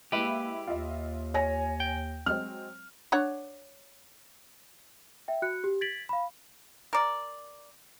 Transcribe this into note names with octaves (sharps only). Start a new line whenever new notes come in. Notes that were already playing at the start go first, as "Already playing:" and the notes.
G#3 A#3 E4 G4 B4
D#2 F4 D#5 E5
C#5 G#5 A#6
G5
F#3 G#3 C4 F6
D4 C#5 F#5
E5 G5
F#4 F#6 C#7
G4
G#6 A6 B6 D7 F#7
F5 B5
A#4 D5